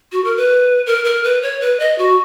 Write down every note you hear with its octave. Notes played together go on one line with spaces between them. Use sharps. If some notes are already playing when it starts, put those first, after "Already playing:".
F#4
A#4
B4
A#4
A#4
B4
C#5
B4
D#5
F#4